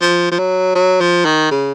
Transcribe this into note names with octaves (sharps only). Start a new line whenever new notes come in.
F3
F3
F#3
F#3
F3
D#3
C#3